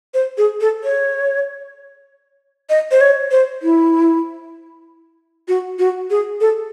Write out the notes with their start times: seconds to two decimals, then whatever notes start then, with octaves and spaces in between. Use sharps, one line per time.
0.14 C5
0.38 G#4
0.61 A4
0.84 C#5
2.70 D#5
2.91 C5
3.01 C#5
3.31 C5
3.63 E4
5.48 F#4
5.79 F#4
6.10 G#4
6.41 A4